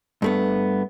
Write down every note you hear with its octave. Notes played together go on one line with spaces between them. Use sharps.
G2 A3 B3